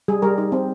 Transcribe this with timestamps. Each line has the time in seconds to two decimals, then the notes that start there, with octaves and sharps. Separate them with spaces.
0.08 G3 G#4
0.22 G3 A#4
0.38 D#4
0.52 C4